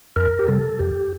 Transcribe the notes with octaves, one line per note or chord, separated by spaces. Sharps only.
F2 A#4
G4
C3 G3 A4
F2 G4